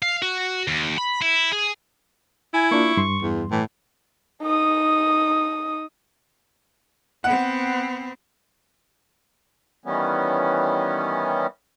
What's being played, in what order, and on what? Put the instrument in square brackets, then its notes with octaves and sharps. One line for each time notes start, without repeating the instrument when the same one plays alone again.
[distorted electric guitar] F5
F#4
D#2
B5
E4
G#4
[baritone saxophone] E4 [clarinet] G#5
[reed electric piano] A#3 D4 F4 [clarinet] C#6
[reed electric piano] G2 C6
[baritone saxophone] E2
[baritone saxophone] A2 [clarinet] E3
[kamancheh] D#4 D#6
[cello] B3 C4 [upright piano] F#5
[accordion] D#3 E3 G3 B3 C#4